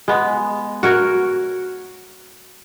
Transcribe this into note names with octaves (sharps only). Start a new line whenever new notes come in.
G#3 B3
F#4 A#4 C#5